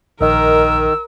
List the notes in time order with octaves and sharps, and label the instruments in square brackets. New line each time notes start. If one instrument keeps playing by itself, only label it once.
[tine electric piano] A#1 D#5 [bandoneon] D#3 [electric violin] A#4 [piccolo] E6